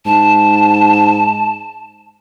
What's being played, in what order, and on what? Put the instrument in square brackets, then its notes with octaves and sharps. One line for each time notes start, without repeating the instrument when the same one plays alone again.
[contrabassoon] G#2 [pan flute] A5